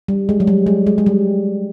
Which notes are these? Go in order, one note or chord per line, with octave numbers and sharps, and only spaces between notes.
G3
G#3
F#3
G3
G#3
G#3
G#3
G3